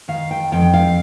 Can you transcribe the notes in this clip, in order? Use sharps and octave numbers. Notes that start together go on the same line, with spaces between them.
D#3 F5
G5
F2 G5
F5